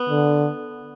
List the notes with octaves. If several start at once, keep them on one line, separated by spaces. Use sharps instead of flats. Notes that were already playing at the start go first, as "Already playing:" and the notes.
Already playing: B3
D3